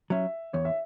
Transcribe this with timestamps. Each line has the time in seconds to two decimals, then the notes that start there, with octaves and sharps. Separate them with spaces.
0.10 F#3 C#4 E5
0.53 E2 C#5
0.65 E5